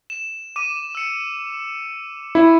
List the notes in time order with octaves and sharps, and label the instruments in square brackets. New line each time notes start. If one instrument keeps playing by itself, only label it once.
[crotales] E7
D6 D#7
E6 C#7
[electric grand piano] E4